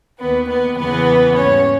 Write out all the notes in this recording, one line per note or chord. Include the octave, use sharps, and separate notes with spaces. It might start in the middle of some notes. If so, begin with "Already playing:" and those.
D#2 D#3 A#3 B3 B4
B3 B4
E2 C#3 E3 B3 B4
G#2 G3 A#3 C#4 C#5